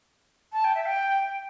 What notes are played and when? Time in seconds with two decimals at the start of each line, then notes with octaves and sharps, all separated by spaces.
0.53 A5
0.64 G5
0.75 E5
0.86 G5